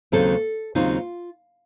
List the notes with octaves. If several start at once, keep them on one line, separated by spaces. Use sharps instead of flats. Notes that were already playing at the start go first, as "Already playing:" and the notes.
D#2 C#3 F#3 C4 D#4 A4
D#2 C#3 F#3 C4 D#4 F4